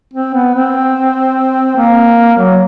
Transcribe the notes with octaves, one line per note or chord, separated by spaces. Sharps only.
C4
B3
C4
A#3
F#3